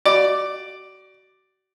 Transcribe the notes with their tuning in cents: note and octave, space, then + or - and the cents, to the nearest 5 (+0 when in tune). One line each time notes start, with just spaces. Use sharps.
F#4 +35 D5 +0